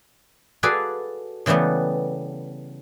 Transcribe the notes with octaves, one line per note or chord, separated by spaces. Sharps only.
F#4 G#4 A4 B4 D5 F5
C#3 E3 G3 A3 B3